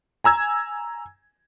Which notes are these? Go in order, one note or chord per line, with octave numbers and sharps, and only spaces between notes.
G#5 A#5 E6 G#6